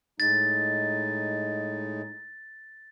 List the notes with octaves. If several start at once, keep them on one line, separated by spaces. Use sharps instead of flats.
A2 G#3 D#4 A6